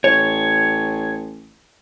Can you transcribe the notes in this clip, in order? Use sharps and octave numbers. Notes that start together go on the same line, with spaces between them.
A1 C#5